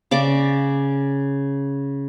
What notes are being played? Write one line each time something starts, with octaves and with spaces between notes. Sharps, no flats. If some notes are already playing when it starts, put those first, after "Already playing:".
C#3 D5 D6